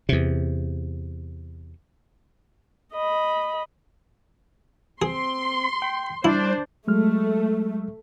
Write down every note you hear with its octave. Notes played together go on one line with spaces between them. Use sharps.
E2 C3
D#5 B5
C4 G#4 C6
G5
G3 D4 E4 C5
F#3 G#3 A3 F6